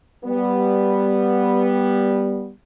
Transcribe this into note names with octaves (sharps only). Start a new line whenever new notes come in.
G3 B3